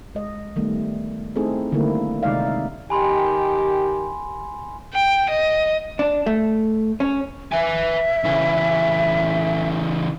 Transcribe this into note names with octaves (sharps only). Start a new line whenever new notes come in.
G#3 D#5
D#3 G3 A3 B3
A3 C4 D#4 E4 G#4 A4
D3 D#3 G3 A3 A#3 E4
C3 D#3 G#3 D#4 D5 F5
E5
D#3 G4 G#5 B5 C6
G5
D#5
D4
A3
C#4
B4 E5 G#5
C#3 E3